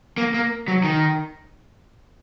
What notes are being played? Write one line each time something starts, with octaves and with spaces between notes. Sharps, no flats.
A#3
A#3
F#3
D#3